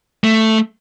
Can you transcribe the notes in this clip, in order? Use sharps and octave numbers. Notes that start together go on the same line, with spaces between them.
A3